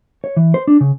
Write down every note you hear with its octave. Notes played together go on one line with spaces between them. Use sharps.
C#5
E3
C5
D4
C#3